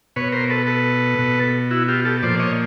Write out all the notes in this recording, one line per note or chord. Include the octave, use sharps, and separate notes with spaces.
B2 B4 C#5
A#4 C5
A4 B4
A4 B4
B2
E4 F#4
F4 G4
G4 A4
A#2 F3 C5 D5
C#5 D#5